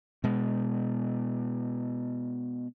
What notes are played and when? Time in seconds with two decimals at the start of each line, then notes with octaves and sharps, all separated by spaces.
0.24 B2 G#3